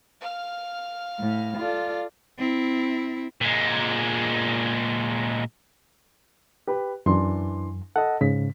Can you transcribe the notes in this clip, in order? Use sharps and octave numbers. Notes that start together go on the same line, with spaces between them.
F5 F6
A2
F4 A4 D5
C4 E4
A#2 G#3
G4 B4
F#2 E3 D4 C6
A4 D#5 F#5
G#2 C#3 B6